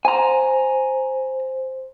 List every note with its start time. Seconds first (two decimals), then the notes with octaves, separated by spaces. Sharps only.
0.05 C5 G#5 A#5